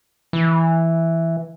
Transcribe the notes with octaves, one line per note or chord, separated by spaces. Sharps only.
E3